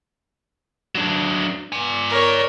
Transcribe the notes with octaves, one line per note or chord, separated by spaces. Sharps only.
F#3 D4
D5 G#5
A#4 C#5